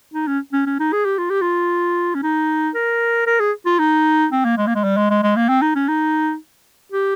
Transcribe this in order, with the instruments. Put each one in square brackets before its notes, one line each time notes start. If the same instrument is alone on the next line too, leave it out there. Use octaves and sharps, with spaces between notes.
[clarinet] D#4
C#4
C#4
C#4
D#4
G#4
G4
F4
G4
F4
C#4
D#4
A#4
A#4
G#4
F4
D#4
C4
A#3
G#3
A#3
G#3
G3
G#3
G#3
G#3
A#3
C4
D#4
C#4
D#4
G4